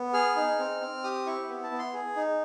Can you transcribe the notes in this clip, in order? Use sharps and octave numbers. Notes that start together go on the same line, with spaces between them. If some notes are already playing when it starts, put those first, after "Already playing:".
Already playing: B3
G#4 F6
D#4
C4
C4
G4 D#6
E4 C#6
B3
A5
B3
C6
G#4
D#4